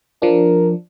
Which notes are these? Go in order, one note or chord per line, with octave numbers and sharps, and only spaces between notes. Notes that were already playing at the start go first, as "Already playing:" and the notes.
F3 D4 A#4